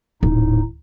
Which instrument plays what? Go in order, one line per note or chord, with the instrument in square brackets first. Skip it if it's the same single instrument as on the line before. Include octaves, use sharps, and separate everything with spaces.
[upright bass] D#1 [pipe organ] A2 D#4